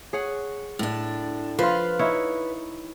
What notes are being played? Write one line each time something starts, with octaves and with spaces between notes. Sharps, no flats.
G#4 C#5 F#5
A2 D4
F3 F4 B4 F5
D#4 E4 C#5